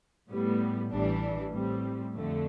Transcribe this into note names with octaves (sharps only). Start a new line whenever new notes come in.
A2 G3 B3
A1 A2 E3 G3 D4
A2 G3 C4
F2 D3 A3